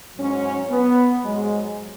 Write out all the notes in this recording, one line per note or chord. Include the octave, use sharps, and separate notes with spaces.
G#2 F#3 C#4
B3
G#2 F#3 G#3